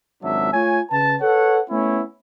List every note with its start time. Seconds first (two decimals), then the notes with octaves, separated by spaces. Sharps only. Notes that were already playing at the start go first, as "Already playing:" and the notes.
0.22 G#1 C#2 F#3 D4 E5
0.52 A3 F4 C#5 G#5
0.91 C#3 B4 A5
1.20 A4 B4 C#5 F#5
1.69 A3 B3 C#4 E4